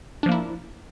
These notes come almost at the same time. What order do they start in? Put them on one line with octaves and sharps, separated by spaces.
D4 F3 A#3 E4